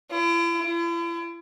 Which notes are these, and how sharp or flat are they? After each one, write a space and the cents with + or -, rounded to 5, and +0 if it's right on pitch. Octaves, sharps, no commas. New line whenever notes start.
E4 +45
E4 +45